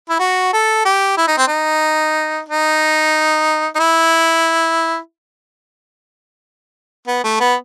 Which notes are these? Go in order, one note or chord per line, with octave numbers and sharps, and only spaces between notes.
E4
F#4
A4
G4
E4
D#4
C4
D#4
D#4
D#4
E4
B3
A3
B3